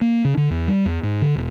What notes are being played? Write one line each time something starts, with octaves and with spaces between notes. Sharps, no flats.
A#3
C#3
D3
E2
G3
E2
G#2
D3
E1